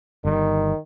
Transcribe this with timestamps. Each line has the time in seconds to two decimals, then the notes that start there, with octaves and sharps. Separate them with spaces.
0.25 G1 D#3 G3